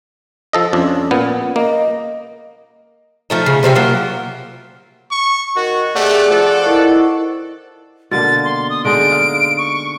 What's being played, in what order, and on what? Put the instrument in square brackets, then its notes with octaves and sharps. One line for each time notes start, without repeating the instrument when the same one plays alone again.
[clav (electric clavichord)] F3 A4 D#5
[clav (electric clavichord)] F2 D4 [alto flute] C#4
[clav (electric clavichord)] A#2 B3
[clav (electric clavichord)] A#3 [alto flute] D#5
[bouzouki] F3 A3 D#4
C#3
C3 C4 C#4 E5
F#3 A#3 F4
[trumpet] C#6
[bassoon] D#3 [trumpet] F#4
[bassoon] C3 [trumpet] A3 [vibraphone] G#4 G#5 [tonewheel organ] D5 F#5
[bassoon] F3 [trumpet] A4
[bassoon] D#3 [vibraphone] E4 C5 C#6
[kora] B2 D3 A#3 [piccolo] A6
[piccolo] C6
D#6
[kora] D3 G#3 D#4 [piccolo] D7
[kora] F5
[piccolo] C#6